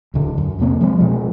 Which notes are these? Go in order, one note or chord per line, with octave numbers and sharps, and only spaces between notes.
D1 D3 D4
F#2
F2 C3 A#3 C4
F3 G#3 A3 C4
B2 D3 F3 G#3